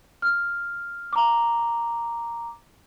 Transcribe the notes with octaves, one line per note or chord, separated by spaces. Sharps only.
F6
A#5 D6